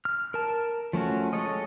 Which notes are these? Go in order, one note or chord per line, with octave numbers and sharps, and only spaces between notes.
F6
A#4 A5
F3 A3 C#4 F#4
G#3 A4 C#5 D#5